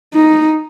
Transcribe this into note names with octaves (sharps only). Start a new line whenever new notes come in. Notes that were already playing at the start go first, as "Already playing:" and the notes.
D#4